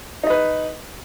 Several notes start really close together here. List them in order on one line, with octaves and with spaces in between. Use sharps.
D#4 D#5 B4